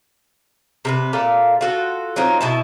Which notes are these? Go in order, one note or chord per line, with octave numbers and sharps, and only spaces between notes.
C3 A#4 B4
A#2 A4 E5 F5
F4 F#4 A4
F#3 C4 D#4 F4
B2 E4 A5